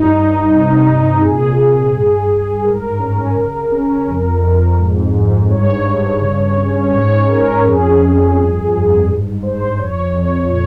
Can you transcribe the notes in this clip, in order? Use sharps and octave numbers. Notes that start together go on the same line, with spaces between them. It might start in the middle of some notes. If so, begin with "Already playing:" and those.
Already playing: G2 D#4
G2
C3
C3
A#2 G#4
A#2
G2
G2
G#2 A#4
C#4
C#3
C#4
F2
F2
G#2
G#2
G2 C#5
G2
C#3
C#4
G#2 C#5
C#4 A#4
F2 G#4
F2
G2
G2
G#2
G#2 C5
F2 C#5
F2 C#5
A#2 C#5